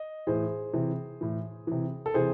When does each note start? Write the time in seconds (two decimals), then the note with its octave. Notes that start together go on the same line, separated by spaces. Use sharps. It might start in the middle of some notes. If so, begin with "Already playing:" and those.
Already playing: D#5
0.27 A2 E3 G#4 C5
0.74 C3 E3
1.21 A2 E3
1.67 C3 E3
2.06 A4
2.14 C3 E3 G#4 C5